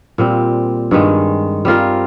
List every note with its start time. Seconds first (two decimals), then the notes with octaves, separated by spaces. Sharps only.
0.18 A#2 G3 C4
0.91 G2 D#3 G#3
1.65 G3 C4 F4 A#4